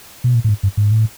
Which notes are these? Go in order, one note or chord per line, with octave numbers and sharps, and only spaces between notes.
B2
A#2
A2
G#2
G2
G#2
A2